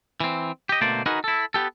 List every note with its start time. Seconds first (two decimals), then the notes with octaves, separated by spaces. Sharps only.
0.20 E3 C4
0.69 G4 D#5
0.81 B2 D3 A3 A#3 C5 D5
1.06 D#4 F#4 G#4 A#4 B4
1.24 E4 A4
1.54 B3 G4 A4